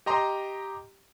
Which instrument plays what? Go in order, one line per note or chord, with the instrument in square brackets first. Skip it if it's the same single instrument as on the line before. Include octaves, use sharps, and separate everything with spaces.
[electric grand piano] G4 D#5 A#5 C6